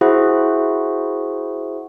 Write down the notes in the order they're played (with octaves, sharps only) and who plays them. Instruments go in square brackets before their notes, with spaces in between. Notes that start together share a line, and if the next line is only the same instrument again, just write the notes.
[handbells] E4 F#4 G#4 C5 E5 F#5